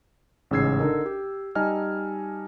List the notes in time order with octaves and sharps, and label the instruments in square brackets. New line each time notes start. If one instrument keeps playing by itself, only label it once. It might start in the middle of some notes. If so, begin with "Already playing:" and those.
[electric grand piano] A1 G#2 C#3 E6 G#6 C7
D3 D#4 A#4
G4
G3 D#4 D#5 G#5 A5 F6